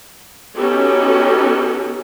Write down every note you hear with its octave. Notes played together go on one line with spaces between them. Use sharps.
B3 C#4 D#4 F#4 G4 A4